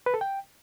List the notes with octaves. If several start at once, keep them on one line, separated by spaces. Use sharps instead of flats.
B4
A4
G5